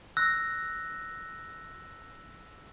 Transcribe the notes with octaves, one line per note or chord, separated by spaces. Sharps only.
E6 F#6 A#6